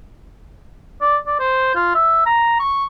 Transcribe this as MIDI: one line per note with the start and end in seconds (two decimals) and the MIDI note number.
1.01 1.17 74
1.27 1.38 74
1.39 1.72 72
1.75 1.93 65
1.95 2.25 76
2.26 2.57 82
2.60 2.85 85